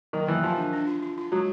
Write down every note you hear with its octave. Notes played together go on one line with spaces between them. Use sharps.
D#3 F#3
E3 F#3
F3 F4
D4
D4
F4
F4
F4
F#3 G#3